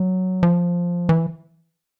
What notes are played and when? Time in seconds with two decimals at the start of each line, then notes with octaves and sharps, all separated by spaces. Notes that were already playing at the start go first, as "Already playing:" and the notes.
Already playing: F#3
0.43 F3
1.09 E3